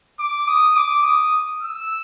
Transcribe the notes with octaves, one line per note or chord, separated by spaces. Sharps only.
D6
D#6
D6
D#6
E6